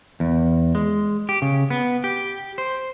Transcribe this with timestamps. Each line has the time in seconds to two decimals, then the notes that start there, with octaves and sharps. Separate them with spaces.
0.20 E2
0.75 G#3
1.29 G4
1.42 C#3
1.70 B3
2.04 G4
2.58 C5